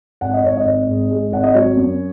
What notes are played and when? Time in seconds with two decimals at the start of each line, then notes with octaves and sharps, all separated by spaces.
0.21 G#1 F#5
0.34 D#5
0.44 G#1 C#5
0.57 D#5
0.65 G#1
0.88 G#2
1.10 G#3
1.32 G#1 F#5
1.44 D#5
1.54 F#3 C#5
1.77 F#2